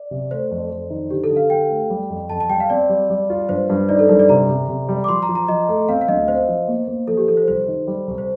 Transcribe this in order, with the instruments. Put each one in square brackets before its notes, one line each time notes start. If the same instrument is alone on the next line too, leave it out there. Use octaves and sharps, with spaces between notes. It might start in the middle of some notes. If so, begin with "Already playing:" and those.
Already playing: [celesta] D5
[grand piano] C3
[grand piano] A3 [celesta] C5
[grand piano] F2
F2
D#3
[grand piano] D3 [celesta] G4
[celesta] A4
[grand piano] D3
[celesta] F5
[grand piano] D3 [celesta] G5
[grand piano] A3
G3
F2
[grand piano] F2 [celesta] A5
[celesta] A5
[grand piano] G3 [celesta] G5
[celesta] F5
[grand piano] C4 [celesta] D5
[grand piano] G3
G3
F4
[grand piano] G2 [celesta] C5
[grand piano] G2
[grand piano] D#4 [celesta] D5
[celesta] A4
[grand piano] G2 [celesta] A#4
[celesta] D5
[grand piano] C3 [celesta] A#5
[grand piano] C3
C3
G3
[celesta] D6
[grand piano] F3 [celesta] C6
[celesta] A#5
[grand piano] F3
[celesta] A#5
[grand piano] F3 [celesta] D#5
[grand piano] A3
[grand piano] C4 [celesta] F5
[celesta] F5
[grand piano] D2 [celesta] D#5
[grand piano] C4 [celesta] C5
[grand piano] F3
A#3
A#3
[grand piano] F3 [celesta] A4
[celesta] G4
[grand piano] F3 [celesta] A4
[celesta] C5
[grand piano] C2 [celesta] C5
[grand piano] D#3
G3
C2
[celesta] C5